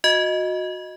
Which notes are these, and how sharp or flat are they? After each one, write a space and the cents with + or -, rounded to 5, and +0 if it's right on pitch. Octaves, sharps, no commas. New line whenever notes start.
F#4 -25 D#5 +0